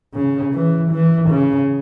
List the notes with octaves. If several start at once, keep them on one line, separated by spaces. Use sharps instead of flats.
C#3
E3
E3
C#3